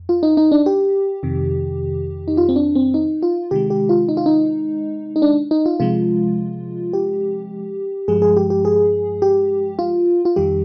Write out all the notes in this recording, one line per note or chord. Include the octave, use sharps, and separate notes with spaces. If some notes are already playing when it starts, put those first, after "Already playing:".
Already playing: F2
F4
D#4
D#4
D4
G4
F2 C3 D#3
D#4
F4
C4
D4
C4
D#4
F4
C3 D#3 G#3 G4
G4
F4
D#4
F4
D#4
D#4
D4
D#4
F4
C3 F3 G#3 F4
G4
G2 F3 G#3 G#4
G#4
G4
G4
G#4
G4
F4
F4
F2 D#3 G3 G4